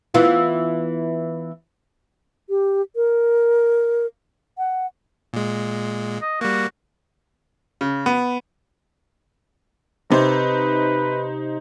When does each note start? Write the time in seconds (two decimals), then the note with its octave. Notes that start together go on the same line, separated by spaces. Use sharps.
0.14 E3 B3 F4
2.49 G4
2.96 A#4
4.58 F#5
5.33 A#2 G#3
6.22 D#5
6.41 G3 A#3 F#4
7.81 C#3
8.06 B3
10.12 C3 D#4 B4 C5